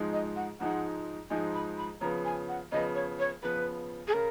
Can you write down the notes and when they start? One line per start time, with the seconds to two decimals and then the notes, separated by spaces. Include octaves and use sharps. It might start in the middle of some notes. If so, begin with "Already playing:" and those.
Already playing: G#2 F3 G#3 D#4
0.13 D#5
0.36 F#5
0.60 G#2 F3 G#3 D#4 F#5
1.30 G#2 F3 G#3 D#4 G#5
1.54 B5
1.77 B5
2.01 C#3 F3 B3 A#5
2.25 G#5
2.48 F#5
2.72 C#3 F3 B3 D#5
2.95 C#5
3.20 C#5
3.43 C#3 F3 B3 B4
4.08 G#4
4.13 C#3 A#4